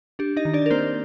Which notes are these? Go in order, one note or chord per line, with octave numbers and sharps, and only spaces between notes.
D4 G4
D#4 D#5
D#3
D4 D5
A#4
A#3 C4 C5